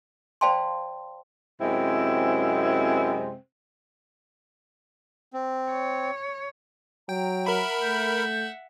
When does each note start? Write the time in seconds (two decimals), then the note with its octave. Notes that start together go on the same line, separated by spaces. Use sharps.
0.41 C5 D5 F5 G5 A5 C6
1.61 F#2 C3 G#3 C4 E4
5.33 C4
5.71 C#5
7.09 F#3 G5 A#5
7.46 A#4 E5 F#5 B5
7.81 A3 G6